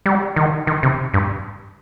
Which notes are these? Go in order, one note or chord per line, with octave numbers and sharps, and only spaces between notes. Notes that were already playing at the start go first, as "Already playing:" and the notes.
G3
D#3
D#3
C3
G2